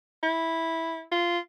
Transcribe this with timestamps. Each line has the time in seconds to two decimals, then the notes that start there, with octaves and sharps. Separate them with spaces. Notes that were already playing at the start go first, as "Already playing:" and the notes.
0.23 E4
1.12 F4